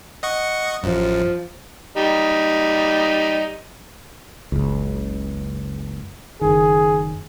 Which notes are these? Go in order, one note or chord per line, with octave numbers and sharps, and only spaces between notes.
D#5 F#5 C#6
A1 F#2 F3
G3 D#4
F#1 C#2
F#1 D#3 G#4